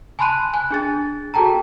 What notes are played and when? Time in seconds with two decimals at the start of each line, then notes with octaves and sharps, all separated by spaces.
0.19 G#5 A5 B5 C6 F#6 D#7
0.54 G#5 F#6
0.71 D4 G#4 A6
1.34 F#4 G#4 A4 G5 A5 A#5